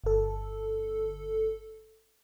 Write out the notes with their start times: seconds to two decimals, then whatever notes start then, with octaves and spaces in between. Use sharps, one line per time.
0.04 G1 A4